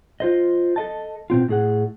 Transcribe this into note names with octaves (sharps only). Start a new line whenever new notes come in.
F4 C5 D#5
A4 D#5 A5
B2 C4 F4
A2 G#4 F#5